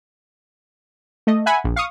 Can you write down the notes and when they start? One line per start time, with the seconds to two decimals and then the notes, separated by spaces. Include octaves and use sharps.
1.27 A3 D#5
1.46 E5 F#5 G#5 B5
1.64 A#1
1.76 F5 C#6 D#6